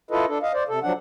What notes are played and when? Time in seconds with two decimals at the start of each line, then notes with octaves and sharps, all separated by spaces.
0.11 E4 F4 A4 B4 D#5
0.28 D4 A4
0.42 D#5 F5
0.53 C5 D5
0.69 C3 A4
0.83 F3 F#3 D4 F#5